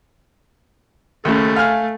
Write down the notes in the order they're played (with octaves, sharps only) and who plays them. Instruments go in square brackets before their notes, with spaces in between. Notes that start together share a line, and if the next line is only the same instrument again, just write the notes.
[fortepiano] D#2 C#3 [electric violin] A3
[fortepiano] F5 G#5 F6